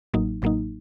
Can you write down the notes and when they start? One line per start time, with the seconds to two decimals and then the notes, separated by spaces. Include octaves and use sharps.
0.14 A1 A2 F#3 A#3 D#4
0.42 A1 A2 F#3 A#3 D#4